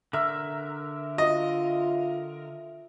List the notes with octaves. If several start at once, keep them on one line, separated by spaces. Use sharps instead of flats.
D3 A#4 E5
F4 D#5